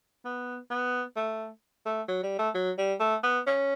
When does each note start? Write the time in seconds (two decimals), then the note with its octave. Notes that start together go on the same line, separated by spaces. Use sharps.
0.25 B3
0.70 B3
1.17 A3
1.86 A3
2.08 F#3
2.23 G3
2.39 A3
2.55 F#3
2.78 G3
3.00 A3
3.23 B3
3.47 C#4